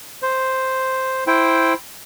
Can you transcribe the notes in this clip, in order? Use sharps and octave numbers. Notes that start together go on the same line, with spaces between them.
C5
E4 C5 G5